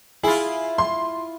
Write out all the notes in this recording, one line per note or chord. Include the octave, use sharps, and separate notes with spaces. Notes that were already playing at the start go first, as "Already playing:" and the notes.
E4 F4 G#4
C6